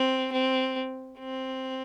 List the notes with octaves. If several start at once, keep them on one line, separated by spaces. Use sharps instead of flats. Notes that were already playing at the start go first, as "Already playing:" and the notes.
Already playing: C4
C4
C4